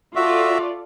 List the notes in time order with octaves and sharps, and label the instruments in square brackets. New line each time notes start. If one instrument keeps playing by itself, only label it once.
[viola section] F4 A4 D5 [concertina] F#4 E5